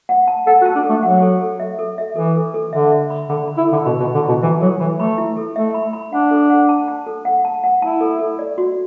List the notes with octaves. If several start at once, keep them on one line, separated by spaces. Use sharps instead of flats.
F#5
A5
A4 F#5
F#4
A5
D4
A4
A3
F#3 F#5
A4
A4
E5
A4
E5
E3 A4
A4
A4
D3 E5
E5
B5
D3 B5
B5
E4
A4
D3
B2 B5
B2
B5
D3
B2 E4
E3 E4
F#3 A4
E3 B5
A3 B5
E4
A4
A3 E5
B5
B5
D4 F#5
A4
F#5
A5
A5
A4
F#5
A5
F#5
E4 A5
A4
A4
D5
F#4